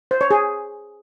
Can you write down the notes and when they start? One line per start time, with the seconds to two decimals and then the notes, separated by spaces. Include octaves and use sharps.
0.11 C5
0.21 C#5
0.31 G#4